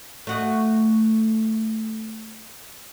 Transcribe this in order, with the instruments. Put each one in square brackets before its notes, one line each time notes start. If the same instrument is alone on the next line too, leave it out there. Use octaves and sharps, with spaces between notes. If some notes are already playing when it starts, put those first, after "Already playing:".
[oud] A3 F#4 D#5